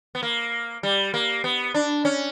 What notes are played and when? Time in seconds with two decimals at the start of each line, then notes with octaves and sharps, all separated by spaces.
0.15 B3
0.23 A#3
0.83 G3
1.14 A#3
1.44 B3
1.74 D4
2.05 C#4